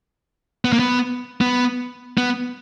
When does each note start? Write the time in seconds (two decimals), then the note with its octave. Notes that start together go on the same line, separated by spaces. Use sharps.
0.65 B3
0.72 A#3
0.79 B3
1.41 B3
2.17 B3